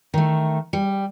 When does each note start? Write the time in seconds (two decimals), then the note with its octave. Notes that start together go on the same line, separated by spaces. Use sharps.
0.14 D#3 A3
0.73 G3